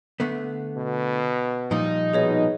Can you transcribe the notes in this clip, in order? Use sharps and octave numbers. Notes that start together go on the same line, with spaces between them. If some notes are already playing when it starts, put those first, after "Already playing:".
D3 A3 B3
B2
A#2 F3 G3 D#4
B2 G#4 C#5 D#5